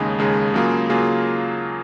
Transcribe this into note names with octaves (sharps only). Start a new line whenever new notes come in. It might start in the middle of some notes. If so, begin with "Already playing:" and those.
Already playing: D#2 C#3 G#3 D#4 G#4
D#2 C#3 G#3 D#4 G#4
C#3 F#3 A#3 F4 G#4
C#3 F#3 A#3 F4 G#4